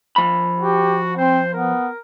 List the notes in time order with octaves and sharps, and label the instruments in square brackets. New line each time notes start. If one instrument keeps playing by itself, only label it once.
[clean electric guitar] F3 B5
[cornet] F#4 [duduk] G4
[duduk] C4 [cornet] C5
[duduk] B3 [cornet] A#4